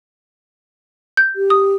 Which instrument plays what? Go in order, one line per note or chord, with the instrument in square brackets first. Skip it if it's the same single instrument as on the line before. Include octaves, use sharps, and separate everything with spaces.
[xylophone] G6
[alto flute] G4
[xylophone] D#6